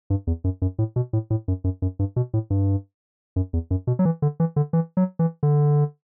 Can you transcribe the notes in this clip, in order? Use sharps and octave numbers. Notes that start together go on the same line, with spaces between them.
G2
E2
F#2
F#2
A2
B2
A2
A2
F#2
F#2
F#2
G2
B2
A2
G2
F#2
E2
F#2
B2
F#3
E3
D3
E3
D3
E3
F#3
E3
D3